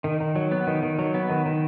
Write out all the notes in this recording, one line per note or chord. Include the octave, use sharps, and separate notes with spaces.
D#3
D#3
F#3
B3
D#3
D#3
F#3
B3
D#3
D#3